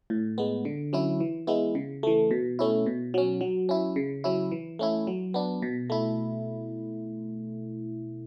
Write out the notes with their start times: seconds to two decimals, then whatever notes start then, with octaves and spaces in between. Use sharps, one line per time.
0.10 A2
0.38 G#3 B3
0.65 D3
0.93 F#3 C#4 E4
1.20 E3
1.47 G#3 B3 E4
1.75 C#3
2.03 E3 A3
2.31 B2
2.59 A3 C#4 E4
2.86 B2
3.14 F#3 C#4
3.41 F#3
3.69 C#4 E4
3.96 C#3
4.24 F#3 C#4 E4
4.51 E3
4.79 A3 C#4 E4
5.07 F#3
5.34 B3 D4
5.62 B2
5.90 A3 E4